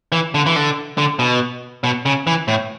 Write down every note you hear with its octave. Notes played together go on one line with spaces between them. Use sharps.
E3
D3
E3
D3
D3
B2
B2
C#3
E3
A2